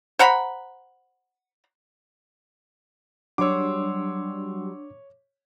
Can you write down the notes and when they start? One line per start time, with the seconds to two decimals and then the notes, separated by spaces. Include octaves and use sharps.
0.19 C5 F#5 A#5 B5
3.38 F#3 G3 D4 C#5 F#5 C6 D6 E6